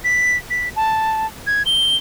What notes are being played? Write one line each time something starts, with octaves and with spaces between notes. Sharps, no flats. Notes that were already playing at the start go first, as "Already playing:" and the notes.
B6
B6
A5
G#6
G7